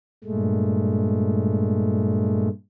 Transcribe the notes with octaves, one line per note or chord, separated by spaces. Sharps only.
G2 A#2 G#3 A3